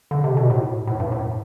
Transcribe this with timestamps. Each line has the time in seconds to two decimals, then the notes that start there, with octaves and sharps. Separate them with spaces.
0.11 D3
0.24 C3
0.37 B2
0.50 A2
0.87 A2
1.00 G2
1.12 A2